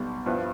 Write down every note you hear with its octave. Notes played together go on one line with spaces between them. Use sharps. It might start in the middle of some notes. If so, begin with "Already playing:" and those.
Already playing: B1 B2 G3
G2 F3 B3 E4